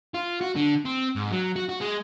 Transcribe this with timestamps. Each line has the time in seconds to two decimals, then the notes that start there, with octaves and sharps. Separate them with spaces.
0.14 F4
0.41 F#4
0.56 D3
0.85 C4
1.16 G#2
1.31 F#3
1.56 F#4
1.69 F#4
1.81 G#3